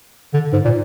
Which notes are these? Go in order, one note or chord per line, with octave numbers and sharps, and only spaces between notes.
D3
G#2
A#2